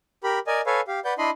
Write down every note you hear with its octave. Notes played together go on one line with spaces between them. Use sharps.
G4 A#4 B5
A#4 D5 D#5 G#5
A4 B4 C#5 F5 G#5
G4 F5
B4 D5 F#5 G6
D4 E4 D#5 B5 C6